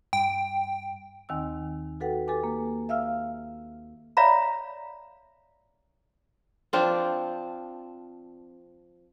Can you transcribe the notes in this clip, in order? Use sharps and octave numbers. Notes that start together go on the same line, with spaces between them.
G2 G5
D#2 D#3 C4 G#5 E6
F#4 A4 B4 F#5 G5
G4 A4 B4 G#5 D6
A#3
E5 F5 E6 F6
C#5 D5 E5 F5 A#5 B5
F3 C4 D4 F4